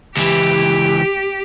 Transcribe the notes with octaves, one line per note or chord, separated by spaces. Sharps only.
C#2 E3 G4